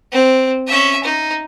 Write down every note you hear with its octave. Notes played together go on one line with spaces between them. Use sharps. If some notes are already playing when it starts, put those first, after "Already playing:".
C4
C#4 E5
D#4